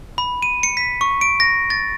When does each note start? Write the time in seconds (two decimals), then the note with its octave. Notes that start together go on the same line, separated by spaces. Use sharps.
0.18 B5
0.42 D#7
0.63 C#7
0.77 B6
1.01 C#6
1.21 D7
1.40 A#6
1.70 A6